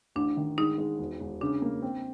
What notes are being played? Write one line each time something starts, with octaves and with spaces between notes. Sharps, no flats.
A1 D4
D#3
G#3 D#4
G#3
E1
E1
C#3 D4
A#3
C4